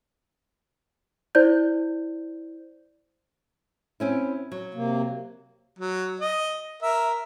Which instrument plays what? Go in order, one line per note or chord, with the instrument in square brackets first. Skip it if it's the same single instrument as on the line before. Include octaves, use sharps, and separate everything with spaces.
[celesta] E4 C5 D5 G6
[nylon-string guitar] C4 C#4 E4
F#3
[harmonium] C3 A#3
[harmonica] F#3
D#5
A#4 E5